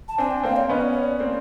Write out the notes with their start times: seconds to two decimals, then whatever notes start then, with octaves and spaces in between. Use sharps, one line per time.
0.08 A5
0.18 C4 D4 G#5
0.31 G5
0.43 A#3 C4 F5
0.56 C#5
0.69 B3 C#4 D#5
0.81 D5
0.92 C#5
1.04 D5
1.20 A#3 C4